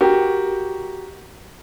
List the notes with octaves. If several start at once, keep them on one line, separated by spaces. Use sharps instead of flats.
F#4 G4 A#4